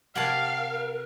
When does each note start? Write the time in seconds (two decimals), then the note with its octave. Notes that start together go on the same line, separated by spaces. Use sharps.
0.15 C3 G4 A#4 C#5 F5 F#5 A5